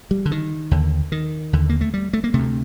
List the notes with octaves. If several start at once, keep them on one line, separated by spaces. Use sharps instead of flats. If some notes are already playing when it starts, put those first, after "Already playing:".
G3
D3
D#3
D#2 D3
D#3
D#2 D3
A#3
A3
G3
A3
A#3
D2 C3 A3